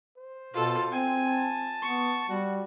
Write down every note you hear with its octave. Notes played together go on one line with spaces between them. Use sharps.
C5
B2 F4 A4
C4 G#5
A5
B3 C#6
G3 F#4